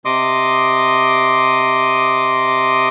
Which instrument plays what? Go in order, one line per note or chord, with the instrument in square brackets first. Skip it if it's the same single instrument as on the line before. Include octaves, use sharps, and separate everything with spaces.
[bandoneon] C3 D#5 C6 D6 D#6